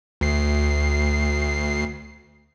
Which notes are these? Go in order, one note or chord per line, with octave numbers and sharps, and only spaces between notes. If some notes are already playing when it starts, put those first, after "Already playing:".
D2 C7